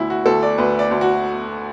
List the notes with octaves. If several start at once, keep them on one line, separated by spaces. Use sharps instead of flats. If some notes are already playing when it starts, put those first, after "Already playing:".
Already playing: D2 E4
F#4
D2 A4
D5
D2 B4
D5
D2
F#4